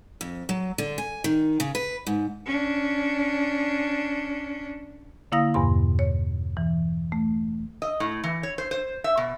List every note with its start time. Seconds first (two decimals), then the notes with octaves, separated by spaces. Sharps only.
0.21 F2
0.49 F#3
0.78 D3
0.98 G#5
1.24 D#3
1.60 C#3
1.75 B4
2.07 G#2
2.46 C#4 D4
5.32 D3 A#3 E4 F5 D#6 A#6
5.54 E2 G2 B2 C6
5.99 C#5
6.57 E3
7.12 A3
7.82 D#5
8.00 A2
8.24 E3
8.43 C#5
8.58 C5
8.71 C5
9.04 E5
9.17 B2